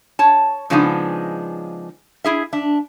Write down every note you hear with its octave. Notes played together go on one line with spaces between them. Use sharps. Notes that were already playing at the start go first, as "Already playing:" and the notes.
C#5 A5
C#3 F3 G#3 B3 D4 D#4
E4 G#4 E5
D4 E5